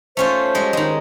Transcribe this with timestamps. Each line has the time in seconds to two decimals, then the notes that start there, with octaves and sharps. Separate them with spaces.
0.17 A3 C#4 F4 C5
0.55 G3 G#3
0.73 D#3 G#3